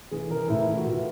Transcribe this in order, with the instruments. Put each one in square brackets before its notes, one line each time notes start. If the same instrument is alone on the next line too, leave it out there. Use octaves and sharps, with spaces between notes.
[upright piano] E3 G#4
E3 A#4
A2 E4
E3
F#4
A2 F4